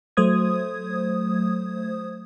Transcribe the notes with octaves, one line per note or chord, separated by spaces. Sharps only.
F#3 A3 C5 D#6 G#6